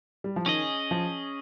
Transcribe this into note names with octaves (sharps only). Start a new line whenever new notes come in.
G3
F3
D#3 C#4 G#4 D#5
F3